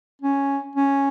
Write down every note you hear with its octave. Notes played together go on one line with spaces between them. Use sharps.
C#4
C#4